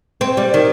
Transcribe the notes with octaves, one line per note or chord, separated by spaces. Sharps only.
C4
G3
D#3